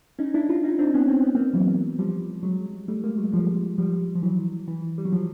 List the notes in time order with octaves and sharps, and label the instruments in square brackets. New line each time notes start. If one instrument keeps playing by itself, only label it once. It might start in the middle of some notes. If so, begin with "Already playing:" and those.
[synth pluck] C#4 D#4
D4 E4
D#4 F4
C#4 D#4
C4 D4
B3 C#4
C4
B3
A#3 C4
E3 F#3
F3 G3
F#3 G#3
G3 A3
G#3 A#3
F#3 G#3
F3 G3
F3 G3
F3
E3 F#3
E3
G3
F#3
F3